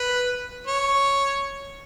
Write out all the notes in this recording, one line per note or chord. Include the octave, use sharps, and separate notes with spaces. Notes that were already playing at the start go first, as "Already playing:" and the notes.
Already playing: B4
C#5